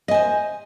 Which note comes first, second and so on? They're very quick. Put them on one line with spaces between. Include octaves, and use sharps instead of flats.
D#5 G#5 C5